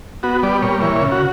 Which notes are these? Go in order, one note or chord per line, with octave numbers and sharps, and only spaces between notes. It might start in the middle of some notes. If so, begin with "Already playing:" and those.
B3 F#4
G3 D5
A#2 C#5
E3 C#5
C#3
F#4